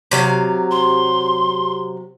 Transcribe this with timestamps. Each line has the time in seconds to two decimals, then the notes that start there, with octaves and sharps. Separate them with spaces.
0.11 C3 F#3 F5
0.71 C6